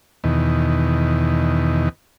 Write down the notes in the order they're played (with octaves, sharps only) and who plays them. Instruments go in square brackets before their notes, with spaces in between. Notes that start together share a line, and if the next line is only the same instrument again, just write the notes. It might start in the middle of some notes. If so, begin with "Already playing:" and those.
[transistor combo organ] E2 B2 D#3